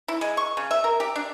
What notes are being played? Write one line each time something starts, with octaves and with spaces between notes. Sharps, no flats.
E4
G#3
C#6
C#3
E5
A#4
G4
D4